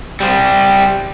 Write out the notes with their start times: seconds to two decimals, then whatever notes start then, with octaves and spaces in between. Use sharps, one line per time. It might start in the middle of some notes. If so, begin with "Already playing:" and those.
0.20 G3 C5